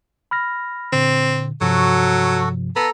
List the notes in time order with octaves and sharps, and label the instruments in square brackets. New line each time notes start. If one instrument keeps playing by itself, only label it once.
[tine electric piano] B5 F6 A#6
[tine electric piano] A#2 D3 [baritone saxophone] C4
[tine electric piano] G2 C3 F3 [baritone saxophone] F#3 [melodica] F#4 A4
[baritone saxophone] B3 [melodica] A4 A#5